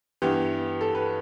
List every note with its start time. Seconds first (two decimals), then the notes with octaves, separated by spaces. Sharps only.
0.22 G2 E3 B3 G4
0.81 A4
0.95 B4